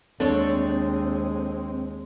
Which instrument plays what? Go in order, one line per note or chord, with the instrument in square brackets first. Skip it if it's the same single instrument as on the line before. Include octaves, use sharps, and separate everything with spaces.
[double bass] D#2 G#3 [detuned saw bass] C4 [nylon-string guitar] D4 [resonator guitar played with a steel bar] A4 C#5